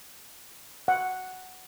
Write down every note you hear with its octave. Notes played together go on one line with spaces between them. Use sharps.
F#5